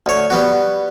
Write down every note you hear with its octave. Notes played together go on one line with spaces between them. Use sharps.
D2 C#5
G3 B3 F#4